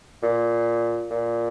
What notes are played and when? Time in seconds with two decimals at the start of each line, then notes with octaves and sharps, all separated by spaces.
0.23 A#2
1.11 A#2